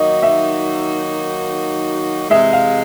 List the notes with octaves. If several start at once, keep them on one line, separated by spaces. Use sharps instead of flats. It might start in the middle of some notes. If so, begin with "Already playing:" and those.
Already playing: D#3 F#3 A#3 D#4 F#4 D#5
E5
C3 E3 G#3 E5
F5